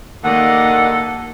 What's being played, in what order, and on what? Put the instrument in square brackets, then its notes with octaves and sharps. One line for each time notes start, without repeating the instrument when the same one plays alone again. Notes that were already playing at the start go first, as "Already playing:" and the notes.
[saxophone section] D#2 D4 F#5 [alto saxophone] D#3 [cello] A#3 D#5 [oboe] A4